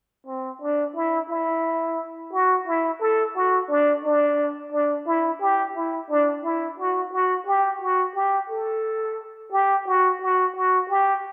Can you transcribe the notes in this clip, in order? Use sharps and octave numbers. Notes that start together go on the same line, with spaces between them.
C4
D4
E4
E4
F#4
E4
A4
F#4
D4
D4
D4
E4
G4
E4
D4
E4
F#4
F#4
G4
F#4
G4
A4
G4
F#4
F#4
F#4
G4